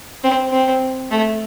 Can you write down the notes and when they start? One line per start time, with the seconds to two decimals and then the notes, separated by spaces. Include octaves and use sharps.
0.24 C4
0.52 C4
1.11 A3